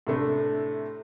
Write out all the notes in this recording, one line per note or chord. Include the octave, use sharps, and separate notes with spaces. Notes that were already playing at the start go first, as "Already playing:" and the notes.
A2 C3 A3 D4